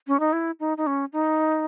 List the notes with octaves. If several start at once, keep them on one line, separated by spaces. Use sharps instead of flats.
C#4
D#4
E4
D#4
D#4
C#4
D#4